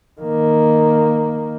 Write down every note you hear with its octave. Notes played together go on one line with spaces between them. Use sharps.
D#3 A#3